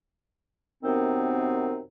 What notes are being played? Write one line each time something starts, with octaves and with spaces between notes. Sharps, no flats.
F#2 C3 D#3 B3 C4 D#4